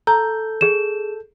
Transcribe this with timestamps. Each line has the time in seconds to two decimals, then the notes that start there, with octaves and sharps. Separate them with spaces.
0.07 A4 A#5 G6
0.61 G#4 E7